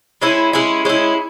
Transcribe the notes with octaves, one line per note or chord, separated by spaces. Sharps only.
G#3 C#4 E4
G#3 C#4 E4
G#3 C#4 E4